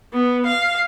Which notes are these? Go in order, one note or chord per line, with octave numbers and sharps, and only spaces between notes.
B3
F5